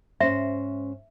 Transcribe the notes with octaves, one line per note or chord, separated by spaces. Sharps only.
G#2 C#4 C5 E5